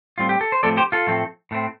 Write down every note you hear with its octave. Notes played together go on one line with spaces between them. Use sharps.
A2 G3 C4 F4
G4
A4
C5
A2 F3 A3 C4 A4 D5
G4 C5
F4 A4
A2 F3 A3 C4
A2 A3 C4